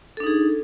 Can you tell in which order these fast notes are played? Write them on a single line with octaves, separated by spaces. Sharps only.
A4 D4 D#4 G#4